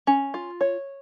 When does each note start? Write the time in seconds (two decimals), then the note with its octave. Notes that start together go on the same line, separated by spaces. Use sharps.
0.07 C#4
0.34 F4
0.61 C#5